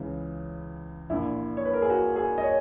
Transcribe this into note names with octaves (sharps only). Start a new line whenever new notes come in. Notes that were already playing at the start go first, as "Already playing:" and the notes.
Already playing: C#2 C#3 E3
A#1 A#2 E4
C#5
B4
A#4
G#4
F#4
G#4
D#5
C#5